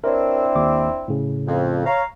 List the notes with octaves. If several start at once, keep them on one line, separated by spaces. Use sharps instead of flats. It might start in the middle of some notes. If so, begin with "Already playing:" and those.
C4 D4 E4 A#4 C#5
D#2 D6
A2 C#3
F2
C#5 F5 A#5